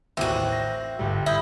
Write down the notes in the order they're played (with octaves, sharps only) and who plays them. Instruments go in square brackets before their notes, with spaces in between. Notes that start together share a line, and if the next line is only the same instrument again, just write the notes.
[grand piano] A1 D#2 [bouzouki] C4 F#4 [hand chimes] E5
[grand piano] A#6
G1 G3
[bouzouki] E4 [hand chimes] E5 [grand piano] D#6 G6